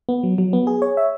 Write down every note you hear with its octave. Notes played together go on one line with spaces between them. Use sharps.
B3
F#3
F#3
B3
G#4
C#5
E5